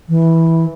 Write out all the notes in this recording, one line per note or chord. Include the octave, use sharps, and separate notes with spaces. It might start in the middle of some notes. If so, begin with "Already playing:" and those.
E3